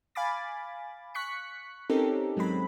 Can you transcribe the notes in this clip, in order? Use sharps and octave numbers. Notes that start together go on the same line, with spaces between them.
F5 G#5 B5 D6 A6
C#6 F#6 B6 C#7
C4 C#4 D#4 G4 A4 A#4
G#1 F#3 G#3 C4 B5